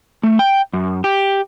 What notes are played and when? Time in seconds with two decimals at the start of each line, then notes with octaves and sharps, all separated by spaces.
0.23 A3
0.39 G5
0.73 F#2
1.04 G4